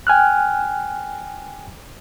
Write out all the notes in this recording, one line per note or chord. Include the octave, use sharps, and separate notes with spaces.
G5 G#5 F6 F#6